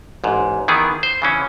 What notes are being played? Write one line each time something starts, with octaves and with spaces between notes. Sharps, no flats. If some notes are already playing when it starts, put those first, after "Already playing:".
A1 G#2
D#3 E3 B3 G#4
C5
C#3 E3 C#4